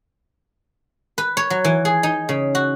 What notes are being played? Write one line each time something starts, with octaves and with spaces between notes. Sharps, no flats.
B4
C#5
F#3
E3
G#4
D#4
C#3
F#4